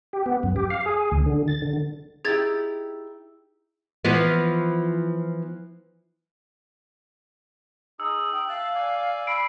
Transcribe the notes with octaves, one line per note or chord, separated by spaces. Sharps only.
G4
B3
F#2
G4
F5
G#4
D2
D3
A6
D3
D#4 E4 G4 G#4 G#6 A6
E3 F3 B3
D#4 G#4 E6
G5
E5 F5 A5 F#6
D5 G#5
B5 E6 C7 D7